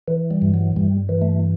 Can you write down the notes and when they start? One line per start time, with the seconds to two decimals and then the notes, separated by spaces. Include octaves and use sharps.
0.08 E3
0.31 G3
0.42 G2
0.54 F#3
0.76 G2 G3
1.09 E3
1.22 A3